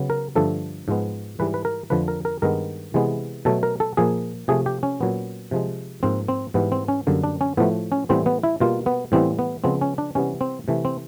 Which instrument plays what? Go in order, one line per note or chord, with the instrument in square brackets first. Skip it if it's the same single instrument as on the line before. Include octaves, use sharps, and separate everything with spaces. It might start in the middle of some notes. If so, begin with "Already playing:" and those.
Already playing: [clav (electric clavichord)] C#3 F#3 B3
A#4
G2 D3 F3 A3 A4
G#2 F3 G#3 B3
G#2 E3 G3 B4
B4
A#4
F2 D3 F3 A3 B4
A#4
A#4
G2 D#3 G#3 B3 A#4
C3 E3 G#3 B3
B2 F#3 A3 A4
A#4
A4
A#2 F3 A#3 G#4
C3 F3 A3 G#4
G4
C#4
A#2 F#3 B3
C3 F3 G#3
G#2 F3 A#3 C4
C4
G#2 E3 G3 B3
C4
C#4
F#2 D3 G3 A#3
D4
C#4
A2 F3 A3 B3
C#4
A2 E3 G3 B3 C4
B3
E4
B2 G3 A#3 F4
B3
A2 E3 G3 B3 C4
B3
C#3 F3 G#3 B3 C4
C#4
D4
C3 E3 G3 B3 C#4
C4
C3 E3 A3
C4